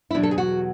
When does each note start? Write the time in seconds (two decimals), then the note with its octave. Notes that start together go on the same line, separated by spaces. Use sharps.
0.11 E4
0.15 E2 B2 F#3 D4
0.23 A4
0.31 G#4
0.38 F#4